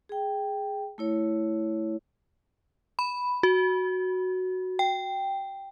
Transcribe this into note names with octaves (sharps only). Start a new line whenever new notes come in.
G#4 G5
A3 E4 C#5
B5
F#4
G5